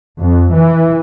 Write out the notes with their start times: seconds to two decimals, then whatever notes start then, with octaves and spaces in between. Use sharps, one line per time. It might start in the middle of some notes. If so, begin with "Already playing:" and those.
0.20 F2
0.53 E3